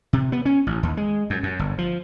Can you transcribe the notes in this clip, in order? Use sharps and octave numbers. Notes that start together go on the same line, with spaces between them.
C3
B3
C#4
A1
D#2
G#3
F#2
F#2
G1
F3